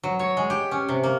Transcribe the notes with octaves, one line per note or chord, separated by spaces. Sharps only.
F#3
C#5
G#3
G4
C#4
C3
A#3